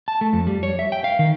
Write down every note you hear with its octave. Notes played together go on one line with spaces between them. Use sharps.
A5
A3
F2
G3
C#5
E5
G5
F5
D#3